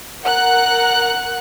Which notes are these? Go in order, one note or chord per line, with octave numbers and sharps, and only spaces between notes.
A#4 F#5 F#6